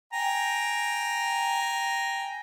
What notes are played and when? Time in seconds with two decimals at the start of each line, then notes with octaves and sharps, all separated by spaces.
0.13 G5 G#5 A#5